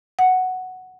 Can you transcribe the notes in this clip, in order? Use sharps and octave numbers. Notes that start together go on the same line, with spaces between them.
F#5